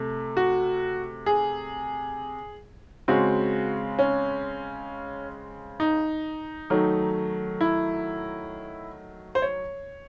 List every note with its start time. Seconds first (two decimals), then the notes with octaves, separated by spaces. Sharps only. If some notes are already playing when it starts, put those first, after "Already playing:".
Already playing: C3 A3
0.37 F#4
1.26 G#4
3.08 C#3 G#3 C4 F#4
3.99 C#4
5.80 D#4
6.70 D#3 F#3 A3
7.61 E4
9.35 C5
9.42 C#5